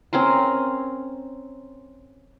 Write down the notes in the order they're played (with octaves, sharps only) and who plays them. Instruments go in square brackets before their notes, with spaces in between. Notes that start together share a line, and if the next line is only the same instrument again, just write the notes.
[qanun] C4 C#4 A#4 C6